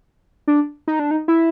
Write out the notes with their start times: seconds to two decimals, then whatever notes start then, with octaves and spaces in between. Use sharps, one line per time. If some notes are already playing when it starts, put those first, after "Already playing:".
0.48 D4
0.88 D#4
0.99 D4
1.11 D#4
1.28 E4